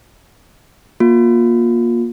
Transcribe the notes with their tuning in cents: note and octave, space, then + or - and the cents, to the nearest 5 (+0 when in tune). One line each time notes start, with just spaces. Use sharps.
A#3 +25 F4 +30